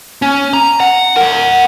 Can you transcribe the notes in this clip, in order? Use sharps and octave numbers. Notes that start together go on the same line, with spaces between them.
C#4
A#5
F#5
A#4 F#5